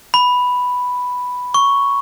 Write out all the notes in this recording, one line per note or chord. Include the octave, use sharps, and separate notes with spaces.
B5
C#6